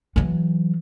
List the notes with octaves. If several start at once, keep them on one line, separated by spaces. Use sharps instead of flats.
E3 F#3